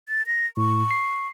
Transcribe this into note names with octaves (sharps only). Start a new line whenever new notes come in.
A6
A#6
A2 C#6
C7